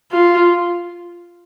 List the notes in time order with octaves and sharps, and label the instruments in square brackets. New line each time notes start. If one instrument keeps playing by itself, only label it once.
[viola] F4